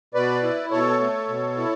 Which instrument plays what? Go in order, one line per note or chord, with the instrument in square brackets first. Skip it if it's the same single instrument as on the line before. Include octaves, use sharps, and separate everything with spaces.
[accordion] B2 B4 D5
E4
B2 A4 C#5
A3
B2
E4